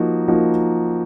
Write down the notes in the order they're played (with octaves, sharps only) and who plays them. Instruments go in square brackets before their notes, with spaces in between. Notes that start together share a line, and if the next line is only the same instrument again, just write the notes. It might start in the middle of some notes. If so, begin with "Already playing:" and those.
Already playing: [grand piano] F3 A#3 D#4 F#4
F3 A#3 D#4 F#4